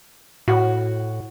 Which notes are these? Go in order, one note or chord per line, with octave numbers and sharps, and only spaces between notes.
A2 F#4